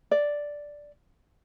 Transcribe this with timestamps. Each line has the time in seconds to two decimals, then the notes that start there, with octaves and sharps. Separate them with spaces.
0.11 D5